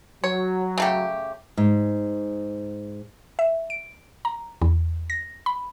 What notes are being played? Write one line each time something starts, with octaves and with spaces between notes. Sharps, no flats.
F#3 C#5
C#3 A3 G4
G#2
E5
D7
A#5
E2
A#6
B5